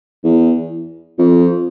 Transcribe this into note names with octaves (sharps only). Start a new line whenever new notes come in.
E2
F2